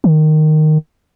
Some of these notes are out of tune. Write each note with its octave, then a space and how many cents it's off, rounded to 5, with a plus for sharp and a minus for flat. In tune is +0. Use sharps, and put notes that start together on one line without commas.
D#3 -10